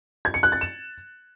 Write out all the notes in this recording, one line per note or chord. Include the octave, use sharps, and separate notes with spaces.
G#6
C#7
F#6
A6
E7